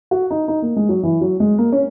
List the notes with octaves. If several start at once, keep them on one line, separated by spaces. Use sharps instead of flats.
F#4
D#4
D#4
A#3
G#3
F#3
E3
F#3
G#3
A#3
C#4